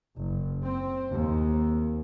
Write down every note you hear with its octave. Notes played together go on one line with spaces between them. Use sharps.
F#1
C4
D#2